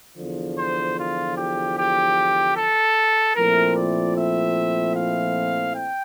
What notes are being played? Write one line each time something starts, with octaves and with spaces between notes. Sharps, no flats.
E2 D3 F3
C5
F4
G4
G4
A4
A#2 F3 A3 C4 E4 A#4
D5
E5
F5
G5